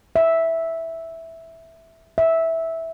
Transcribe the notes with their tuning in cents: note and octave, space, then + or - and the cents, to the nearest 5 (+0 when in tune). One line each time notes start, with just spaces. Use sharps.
E5 -5
E5 -10